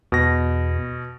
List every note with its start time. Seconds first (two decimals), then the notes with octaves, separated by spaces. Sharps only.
0.12 E2 B2 A#6